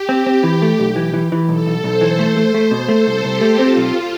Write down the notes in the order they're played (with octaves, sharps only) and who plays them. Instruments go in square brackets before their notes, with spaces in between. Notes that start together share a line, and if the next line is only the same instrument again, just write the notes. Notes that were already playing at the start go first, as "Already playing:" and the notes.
Already playing: [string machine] G4
[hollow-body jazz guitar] C4
C4
E3
A3
B1
E3
E3
E3
[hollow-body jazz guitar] B1 [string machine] A4
[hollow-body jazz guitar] B1
[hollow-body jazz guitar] B1 [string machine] C5
[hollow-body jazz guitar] E3
A3
A3
A3
B2
[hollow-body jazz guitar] A3 [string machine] A4
[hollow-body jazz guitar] C2
[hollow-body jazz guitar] C2 [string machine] G4
[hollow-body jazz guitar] A3
[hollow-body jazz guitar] C4 [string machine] F4
[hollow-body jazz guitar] B1